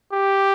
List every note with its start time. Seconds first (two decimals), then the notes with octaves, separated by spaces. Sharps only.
0.12 G4